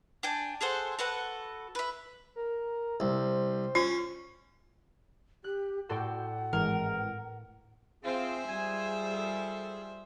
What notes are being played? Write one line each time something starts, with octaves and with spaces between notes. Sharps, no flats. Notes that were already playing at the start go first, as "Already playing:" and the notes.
D4 G5 G#5
G#4 A4 C5 F#5
F#4 A4 B4 F#5
B4 E5
A#4
C2 C5
C#4 F4
G4 F#6
A2 F#4 A4 D5 F#5 G5 C6
G#1 E3 G#3 A#4
C4 F4 G#4 C5 E5
G3 F4 G#5
A4